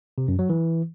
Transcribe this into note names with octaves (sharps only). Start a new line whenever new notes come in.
C3
F#2
F#3
E3